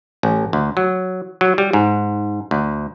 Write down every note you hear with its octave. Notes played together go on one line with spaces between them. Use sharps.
A1
D2
F#3
F#3
G3
G#2
D2